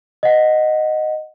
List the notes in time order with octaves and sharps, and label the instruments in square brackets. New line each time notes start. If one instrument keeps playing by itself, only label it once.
[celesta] D#5 F#5